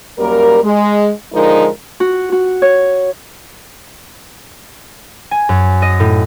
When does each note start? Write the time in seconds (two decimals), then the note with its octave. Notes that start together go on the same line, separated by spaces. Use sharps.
0.18 F#2 G3 A#3 A#4
0.63 G#3
1.34 D3 F3 G#3 D#4 A#4
2.00 F#4
2.32 F#4
2.62 C#5
5.31 G#5
5.49 F#2
5.82 D#5
6.00 A2